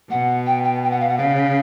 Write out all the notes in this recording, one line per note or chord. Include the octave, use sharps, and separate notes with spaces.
B2 F#5
G5
G5
G5
F#5
F5
F#5
C#3 F5